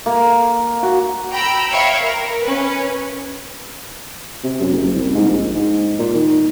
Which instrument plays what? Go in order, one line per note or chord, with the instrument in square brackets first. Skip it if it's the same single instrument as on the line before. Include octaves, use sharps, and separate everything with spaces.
[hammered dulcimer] A#3
F#4
[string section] G5 A#5 B5 E6
C#5 E5 F5 G5 B5
A#4
C#4 B4
[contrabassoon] C3
F#2
F#1
C2
G#2
A#1
G#2
A#2
D#3